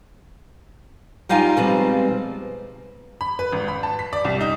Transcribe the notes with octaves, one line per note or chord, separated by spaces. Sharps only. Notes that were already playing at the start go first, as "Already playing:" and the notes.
G3 D#4 F4 F5 G#5 A#5
B2 F3 G3 G#3 C4
B5
B4
G#1
B5
A5
B6
D5
C2
D#4